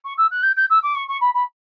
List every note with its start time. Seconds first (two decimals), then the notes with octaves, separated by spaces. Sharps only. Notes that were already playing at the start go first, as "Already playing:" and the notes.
0.04 C#6
0.17 E6
0.31 F#6
0.43 G6
0.56 G6
0.70 E6
0.83 D6
0.95 C#6
1.08 C#6
1.21 B5
1.34 B5